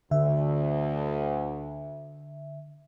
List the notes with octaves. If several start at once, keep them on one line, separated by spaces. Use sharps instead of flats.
D2 D3 E5